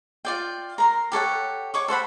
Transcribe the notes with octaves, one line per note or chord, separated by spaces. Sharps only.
F4 D5 G5
A#4 A#5 C6
G4 A4 C#5 F#5
C#5 C#6 D6
A4 C5 F#5 B5